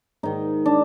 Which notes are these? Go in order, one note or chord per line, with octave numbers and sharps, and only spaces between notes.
G#2 D#3 D#4
D4